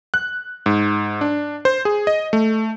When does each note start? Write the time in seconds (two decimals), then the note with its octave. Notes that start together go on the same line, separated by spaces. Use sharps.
0.14 F#6
0.66 G#2
1.21 D4
1.65 C5
1.85 G#4
2.07 D#5
2.33 A3